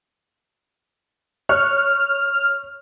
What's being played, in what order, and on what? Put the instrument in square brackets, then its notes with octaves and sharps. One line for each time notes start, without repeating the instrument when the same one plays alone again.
[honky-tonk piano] C#5 C#6 F#6 [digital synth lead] F6